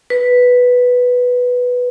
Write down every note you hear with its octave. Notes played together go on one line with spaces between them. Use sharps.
B4